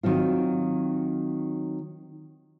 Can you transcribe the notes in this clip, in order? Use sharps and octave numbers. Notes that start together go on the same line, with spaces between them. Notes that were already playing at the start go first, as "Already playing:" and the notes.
D#3 F#3 C4 F4